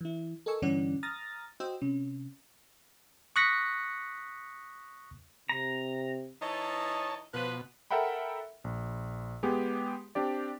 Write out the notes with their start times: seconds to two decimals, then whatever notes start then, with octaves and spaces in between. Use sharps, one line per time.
0.01 E3 E4
0.46 A4 A#4 D#5 G#5 C#6 E6
0.62 G2 D3 E3 C#4 D5 F#5
1.03 A#5 D#6 F6 A6 A#6
1.60 F#4 C5 D#5 G5 E6
1.82 C3 C#4
3.36 C#6 D#6 F#6 A#6 B6 C#7
5.49 C3 A#5
6.42 E3 D#4 C#5 D#5 A5
7.34 B2 F3 B4
7.91 A4 A#4 E5 F#5 G5 B5
8.64 A#1
9.43 G#3 B3 G4 G#4
10.15 C4 D4 G4 D5